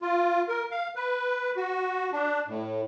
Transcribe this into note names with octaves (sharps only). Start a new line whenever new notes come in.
F4
A#4
F5
B4
F#4
D4
A2